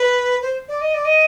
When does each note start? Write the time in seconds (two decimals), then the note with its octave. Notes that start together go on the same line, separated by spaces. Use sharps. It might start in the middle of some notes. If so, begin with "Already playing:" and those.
Already playing: B4
0.42 C5
0.68 D5
0.81 D#5
0.94 D5
1.05 D#5